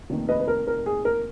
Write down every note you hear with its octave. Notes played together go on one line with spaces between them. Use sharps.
F1 D#2 D#3
B4 D#5
B4
A#4
A#4
G#4
A#4